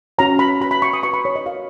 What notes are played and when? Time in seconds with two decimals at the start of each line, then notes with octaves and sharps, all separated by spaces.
0.18 C#4 F#4 C#5 A#5
0.39 B5
0.61 F#4 B5
0.65 B4
0.71 B5
0.82 C#6
0.93 D#6
1.03 F#4 B4 C#6
1.13 B5
1.25 C#5
1.36 D#5
1.46 F#4 A#4 C#5 F5